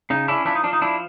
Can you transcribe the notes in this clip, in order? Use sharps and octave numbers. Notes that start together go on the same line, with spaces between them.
C#3 D#4
C#4 D4 E4
F3 D4 E4
D#4
F3 D4
D#4
F3 D4 E4